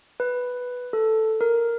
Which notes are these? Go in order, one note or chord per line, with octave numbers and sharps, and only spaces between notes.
B4
A4
A#4